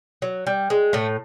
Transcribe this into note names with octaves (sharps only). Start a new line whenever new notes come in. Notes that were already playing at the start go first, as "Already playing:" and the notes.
F#3
G3
G#3
A2 A3